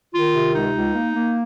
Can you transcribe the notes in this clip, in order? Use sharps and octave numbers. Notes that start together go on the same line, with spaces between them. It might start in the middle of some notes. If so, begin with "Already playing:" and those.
D#3 F4
C3
C#2 D#4
C#2
A#3
A#3